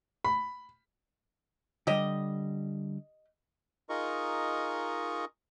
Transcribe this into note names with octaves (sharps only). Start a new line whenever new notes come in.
B5
D3 G3 G4 D#5
D#4 F4 G#4 A#4 D#5 C#6